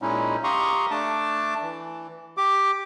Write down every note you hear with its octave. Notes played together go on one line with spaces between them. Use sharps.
A#2 G#3 C#4 D#4 E4
G4 F5 A#5 C6 C#6 D#6
A3 D4 A5 D6
E3
G4 D6